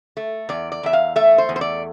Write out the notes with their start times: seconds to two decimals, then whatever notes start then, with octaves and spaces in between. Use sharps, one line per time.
0.17 A3
0.49 E2 D5
0.72 D5
0.83 E2 E5
0.93 F5
1.16 A3 E5
1.38 C5
1.49 E2
1.56 C5
1.61 D5